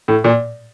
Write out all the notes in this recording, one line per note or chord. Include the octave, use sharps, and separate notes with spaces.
A2
A#2